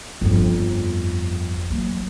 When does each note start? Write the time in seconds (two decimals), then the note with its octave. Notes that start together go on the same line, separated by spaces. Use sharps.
0.21 G1 F2
1.70 F#3 A#3